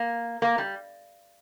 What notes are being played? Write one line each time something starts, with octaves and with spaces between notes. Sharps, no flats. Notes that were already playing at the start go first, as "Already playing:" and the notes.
Already playing: A#3
A#3
G3